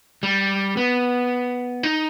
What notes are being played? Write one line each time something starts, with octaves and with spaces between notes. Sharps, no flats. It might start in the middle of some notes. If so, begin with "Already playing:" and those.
G3
B3
D#4